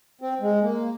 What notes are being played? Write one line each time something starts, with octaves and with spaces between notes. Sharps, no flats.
C4
G#3
A#3